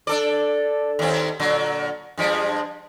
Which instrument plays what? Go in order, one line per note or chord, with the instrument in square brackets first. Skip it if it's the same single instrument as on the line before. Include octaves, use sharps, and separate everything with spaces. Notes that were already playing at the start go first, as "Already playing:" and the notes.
[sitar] D4 A4 D5
D#2 C4
A#2 D3 F#3
G2 F3 G#3